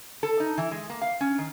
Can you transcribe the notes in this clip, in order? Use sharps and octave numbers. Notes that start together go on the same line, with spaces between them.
A4
D#4
E3
G#3
A#3
F5
C#4
D#3